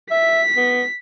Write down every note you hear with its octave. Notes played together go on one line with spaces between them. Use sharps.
E5 B6
B3